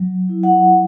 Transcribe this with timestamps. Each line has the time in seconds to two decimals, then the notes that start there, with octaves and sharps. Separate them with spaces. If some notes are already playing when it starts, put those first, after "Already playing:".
Already playing: F#3
0.29 E4
0.43 F#5